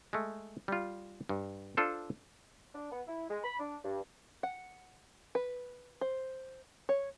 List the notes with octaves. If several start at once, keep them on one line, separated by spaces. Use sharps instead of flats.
G#3 A3
G3 F4
G2
D4 F4 A4 C5
D4
B3
E4
G#3
B5
D4
G2
F#5
B4
C5
C#5